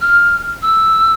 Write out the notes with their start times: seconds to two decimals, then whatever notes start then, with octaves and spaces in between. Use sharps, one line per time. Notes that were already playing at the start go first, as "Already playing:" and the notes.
0.01 F6
0.62 E6